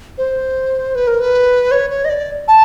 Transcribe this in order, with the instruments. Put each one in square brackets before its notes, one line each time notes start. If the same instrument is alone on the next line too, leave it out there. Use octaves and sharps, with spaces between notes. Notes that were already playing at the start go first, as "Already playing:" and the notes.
[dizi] C5
B4
A#4
B4
C#5
C#5
D#5
D5
A5